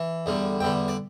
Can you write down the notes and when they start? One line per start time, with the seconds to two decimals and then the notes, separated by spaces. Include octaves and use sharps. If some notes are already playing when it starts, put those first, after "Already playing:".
Already playing: E3
0.26 E2 D3 G3
0.60 E2 D3 G3 G5
0.88 D5